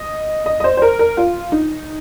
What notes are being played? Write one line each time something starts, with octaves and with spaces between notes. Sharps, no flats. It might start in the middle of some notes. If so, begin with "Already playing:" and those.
Already playing: D#5
D#5
D#5
C5
C5
A#4
A#4
F4
D#4